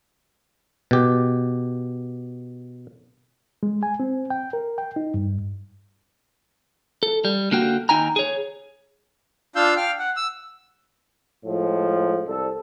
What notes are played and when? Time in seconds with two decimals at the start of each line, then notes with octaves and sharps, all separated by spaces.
0.91 B2 G4
3.63 G#3
3.83 G#5
4.00 C4
4.30 G5
4.53 A#4
4.78 G5
4.96 D#4
5.14 G2
7.03 A4
7.25 G3
7.51 D3 A#3 F#4 G5
7.89 D#2 D#4 G5 G#5 A#5
8.16 G#4 C#5
9.56 D4 F4 F5 E6 G6
9.77 F5 G5 F6
9.99 F#5
10.16 E6
11.45 A2 F3 G#3
12.27 C2 A4